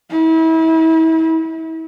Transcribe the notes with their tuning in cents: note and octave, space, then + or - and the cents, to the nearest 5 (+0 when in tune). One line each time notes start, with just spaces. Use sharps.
E4 -35